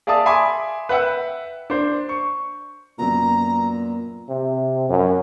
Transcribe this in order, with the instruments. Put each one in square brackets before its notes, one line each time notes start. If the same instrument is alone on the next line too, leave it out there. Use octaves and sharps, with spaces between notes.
[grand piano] G#4 D5 E5 F5 A5 D#6
E5 G#5 B5 C6 D6 D#6
B4 E5 F#5 G5 E6
D4 C5
C#6
[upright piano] F#2 B3 [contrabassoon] A#2 [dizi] A#5
[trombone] C3
F#2